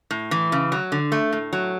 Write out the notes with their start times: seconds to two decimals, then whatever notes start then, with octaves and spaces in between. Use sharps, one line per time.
0.11 A2
0.31 E3
0.52 C#3
0.72 F#3
0.92 D3
1.12 A3
1.33 A2
1.53 F#3